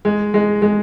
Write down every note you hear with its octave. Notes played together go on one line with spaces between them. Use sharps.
G#3
G#3
G#3